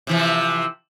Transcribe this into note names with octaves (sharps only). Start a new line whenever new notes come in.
C3 E3 F3